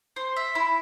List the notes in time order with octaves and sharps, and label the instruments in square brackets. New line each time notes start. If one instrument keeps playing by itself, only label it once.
[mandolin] C5
E5
E4